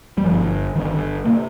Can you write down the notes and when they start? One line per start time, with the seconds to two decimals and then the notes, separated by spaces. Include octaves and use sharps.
0.18 G3
0.24 G1 G2 F3
0.75 G1 G2 D#3
1.26 C3 A#3